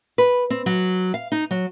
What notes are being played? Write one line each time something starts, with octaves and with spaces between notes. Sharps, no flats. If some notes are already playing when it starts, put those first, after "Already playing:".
B4
C4
F#3
F5
D#4
F#3